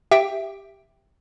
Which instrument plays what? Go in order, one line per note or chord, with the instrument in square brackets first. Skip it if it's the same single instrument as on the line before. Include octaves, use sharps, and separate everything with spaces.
[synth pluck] G4 E5 G5